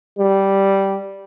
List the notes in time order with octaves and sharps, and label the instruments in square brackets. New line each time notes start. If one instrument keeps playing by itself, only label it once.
[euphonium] G3